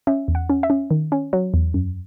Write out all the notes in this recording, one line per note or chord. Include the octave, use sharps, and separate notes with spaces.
C#4 E5
E2
F#5
C#4
E5
C#4
D#3
C#4
F#3
E2
F#2